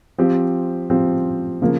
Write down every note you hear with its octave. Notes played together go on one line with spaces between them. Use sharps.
F3 C4 G4
F3 C4 G4
C#3 F3 A#3